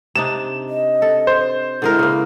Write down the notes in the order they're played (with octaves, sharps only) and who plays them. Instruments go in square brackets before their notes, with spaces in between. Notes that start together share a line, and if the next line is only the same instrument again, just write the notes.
[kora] C3 D4 D#4 [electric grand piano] E7
[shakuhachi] D#5
[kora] A4
[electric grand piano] C5
[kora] D3 G#3 A#4 [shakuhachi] E4
[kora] C#3 A#3